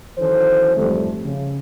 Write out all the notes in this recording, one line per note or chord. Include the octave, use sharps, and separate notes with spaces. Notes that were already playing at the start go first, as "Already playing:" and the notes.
D#3 E3 F#3 C#4 A4 C5
F2 G#2 G3 A3
C#3